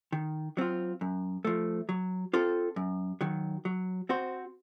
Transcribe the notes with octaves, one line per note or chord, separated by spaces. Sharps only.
D#3
F#3 C4 F4
F#2
F3 A3
F#3
C4 F4 A4 C5
F#2
D#3 F#3
F#3
C4 F#4 C5